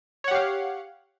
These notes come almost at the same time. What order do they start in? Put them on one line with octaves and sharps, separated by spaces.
C#5 F#5 G4 F5